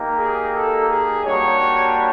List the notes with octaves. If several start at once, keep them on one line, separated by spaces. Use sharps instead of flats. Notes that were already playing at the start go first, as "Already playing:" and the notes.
Already playing: A#3 D#4 G4
G#4
A4
G#4
G3 A#3 D4 F#4 C#5